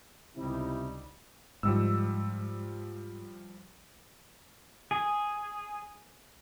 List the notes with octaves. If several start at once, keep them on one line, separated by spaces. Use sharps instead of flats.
C#2 C3 G3 D#4 E4
G#2 F3 G3 E6
G#4